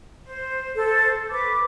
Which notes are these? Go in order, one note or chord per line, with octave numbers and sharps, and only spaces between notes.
C5
A4 C5
B4 D6